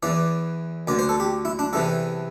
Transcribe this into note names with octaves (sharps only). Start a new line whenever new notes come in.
E2 E3 D5
D2 D3 D5
C5
A4
G4
E4
D4
E2 C3 E3 A4